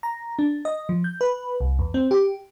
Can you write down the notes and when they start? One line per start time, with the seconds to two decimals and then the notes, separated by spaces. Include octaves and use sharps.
0.03 A#5
0.39 D4
0.65 D#5
0.89 F3
1.04 G6
1.21 B4
1.60 C2
1.79 E2
1.94 C4
2.11 G4